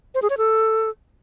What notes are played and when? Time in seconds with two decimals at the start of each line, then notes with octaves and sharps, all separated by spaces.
0.15 C5
0.22 G#4
0.30 C#5
0.38 A4